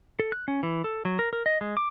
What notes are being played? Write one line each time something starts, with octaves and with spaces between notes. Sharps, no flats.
A4
F#6
C#4
E3
A4
F#3
A#4
A#4
D#5
G#3
D6